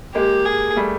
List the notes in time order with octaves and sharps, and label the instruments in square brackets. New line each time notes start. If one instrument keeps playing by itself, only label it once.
[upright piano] G#3 A#3 [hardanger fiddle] G4
[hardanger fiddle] G#4
[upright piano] G3 A3